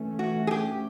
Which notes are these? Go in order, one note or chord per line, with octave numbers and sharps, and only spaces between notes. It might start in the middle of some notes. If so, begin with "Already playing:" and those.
Already playing: E3 A3 C#4
F#4
G#4
G4